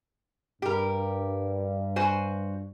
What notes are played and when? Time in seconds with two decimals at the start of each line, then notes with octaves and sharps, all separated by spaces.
0.62 G2 G4 A#4
1.96 F#4 C5 G#5